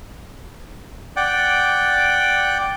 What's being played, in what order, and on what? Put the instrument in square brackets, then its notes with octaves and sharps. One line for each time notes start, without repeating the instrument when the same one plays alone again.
[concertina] D5 F#5 G5